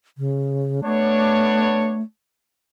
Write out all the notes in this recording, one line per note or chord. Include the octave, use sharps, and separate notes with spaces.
C#3
A3 B3 D4 C#5